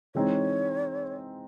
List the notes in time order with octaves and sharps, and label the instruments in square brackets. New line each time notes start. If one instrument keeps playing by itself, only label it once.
[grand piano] E3 G#3 C4 D#4 [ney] C#5